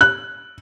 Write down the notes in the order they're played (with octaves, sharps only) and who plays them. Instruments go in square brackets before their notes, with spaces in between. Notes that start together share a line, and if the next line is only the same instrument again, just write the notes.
[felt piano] F#6